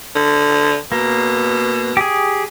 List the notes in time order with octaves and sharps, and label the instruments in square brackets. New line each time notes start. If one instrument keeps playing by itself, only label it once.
[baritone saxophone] D3
[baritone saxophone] B2 [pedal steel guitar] A#3
[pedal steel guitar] G4 G#4